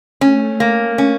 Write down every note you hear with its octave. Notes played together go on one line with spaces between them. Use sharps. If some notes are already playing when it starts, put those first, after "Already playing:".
A3 C#4
A#3
C#4